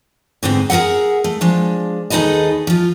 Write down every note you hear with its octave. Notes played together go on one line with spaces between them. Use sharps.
G#2 D3 B3 C4
G#4 A#4 B4 E5 F#5
A3
F3 G#3 D4
D#2 D#4 G#4 A4 B4 D#5
F3 F4